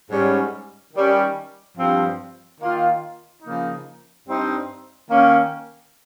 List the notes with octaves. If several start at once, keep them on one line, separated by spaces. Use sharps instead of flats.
G#2 G3 C#4
D#3 G3 C#4
G2 F3 C4
D#3 A#3 F4
C#3 F3 A#3 D#4
G2 G3 C4 D#4
D#3 A#3 C#4